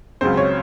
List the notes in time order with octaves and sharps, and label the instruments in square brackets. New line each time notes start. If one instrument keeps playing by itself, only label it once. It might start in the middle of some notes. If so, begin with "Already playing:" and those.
[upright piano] C#2 C#3 F#3 C4 C5
C#5